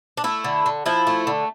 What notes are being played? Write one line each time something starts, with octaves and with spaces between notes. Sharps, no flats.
D4
A3 E4
D3
D3
F3 E4
A3
D3